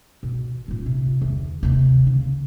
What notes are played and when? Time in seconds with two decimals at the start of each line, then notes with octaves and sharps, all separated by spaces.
0.23 B2
0.68 A#2 C#4
0.86 C3
1.21 E2 D3
1.63 D#2 C3
2.07 C#3